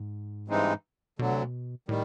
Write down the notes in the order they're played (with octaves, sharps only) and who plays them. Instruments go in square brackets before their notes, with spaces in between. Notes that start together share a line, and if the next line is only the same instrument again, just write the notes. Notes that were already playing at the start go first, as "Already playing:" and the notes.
Already playing: [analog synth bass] G#2
[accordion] G2 E3 G#3 C4 D#4
[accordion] D2 D3 F#3 [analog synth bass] B2
[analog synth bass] C3
B2
[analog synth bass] A2 [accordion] D#3 G3